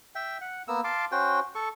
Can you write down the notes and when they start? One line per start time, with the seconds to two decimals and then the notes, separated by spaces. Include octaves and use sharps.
0.15 E5 G5
0.41 F#5
0.68 A#3 B3 E6
0.84 F5 A5 C6 D6
1.12 C#4 F#4 C5 G5
1.55 A4 C#6